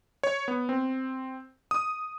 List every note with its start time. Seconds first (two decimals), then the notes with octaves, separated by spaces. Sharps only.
0.23 C#5
0.48 B3
0.69 C4
1.71 D#6